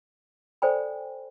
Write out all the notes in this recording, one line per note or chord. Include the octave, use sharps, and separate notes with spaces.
A4 C5 D5 G5 G#5 B5